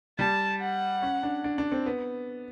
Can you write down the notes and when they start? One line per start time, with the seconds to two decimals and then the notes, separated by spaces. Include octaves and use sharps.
0.19 G3 A5
0.61 F#5
1.02 C#4
1.23 D4
1.44 D4
1.58 D4
1.72 C4
1.86 B3